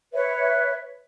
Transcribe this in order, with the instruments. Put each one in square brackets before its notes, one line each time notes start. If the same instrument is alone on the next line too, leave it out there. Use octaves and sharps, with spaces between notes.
[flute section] B4 C#5 E5